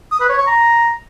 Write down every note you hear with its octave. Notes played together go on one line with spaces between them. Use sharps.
D#6
B4
C#5
C#6
A#5